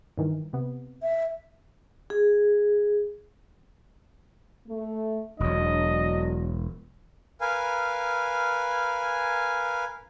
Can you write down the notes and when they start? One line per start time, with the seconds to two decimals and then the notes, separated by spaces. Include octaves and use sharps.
0.18 G2 D#3 E3
0.53 C3 B3
1.03 E5
2.10 G#4
4.68 A3
5.40 E1 E2 F#3 D4 D#5
7.41 A#4 B4 F5 G#5